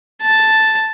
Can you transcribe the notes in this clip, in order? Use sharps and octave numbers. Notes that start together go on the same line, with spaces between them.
A5